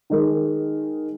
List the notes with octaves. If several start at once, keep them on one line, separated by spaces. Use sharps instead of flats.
D#3 G#3 D#4 A#4